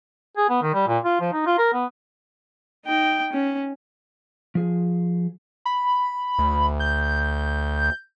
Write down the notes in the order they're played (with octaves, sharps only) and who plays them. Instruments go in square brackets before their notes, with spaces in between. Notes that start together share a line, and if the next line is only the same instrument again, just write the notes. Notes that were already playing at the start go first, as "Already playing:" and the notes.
[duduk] G#4
B3
D#3
G3
A#2
F4
F3
D#4
F4
A#4
B3
[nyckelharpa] D#4 G5
C#4
[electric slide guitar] F3 G#4
[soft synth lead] B5
[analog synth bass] D2
[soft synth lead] G6